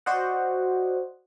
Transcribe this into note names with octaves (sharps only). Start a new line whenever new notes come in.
F#4 C5 D5 D#5 F#5